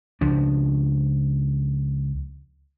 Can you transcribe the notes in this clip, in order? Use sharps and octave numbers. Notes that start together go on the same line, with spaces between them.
C#2 F3 D4